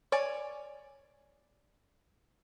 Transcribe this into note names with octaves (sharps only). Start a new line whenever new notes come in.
C#5 D5 G#5